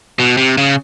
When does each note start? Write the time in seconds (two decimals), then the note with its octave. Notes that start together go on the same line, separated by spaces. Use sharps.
0.19 B2
0.37 C3
0.58 C#3